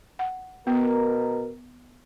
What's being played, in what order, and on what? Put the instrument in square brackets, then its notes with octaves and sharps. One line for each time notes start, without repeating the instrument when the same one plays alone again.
[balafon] F#5
[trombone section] B2 A#4 [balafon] B3